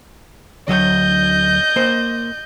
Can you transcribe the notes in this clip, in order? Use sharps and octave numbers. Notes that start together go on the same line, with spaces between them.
D2 F#3 C#5 D#5 G6
A#3 C5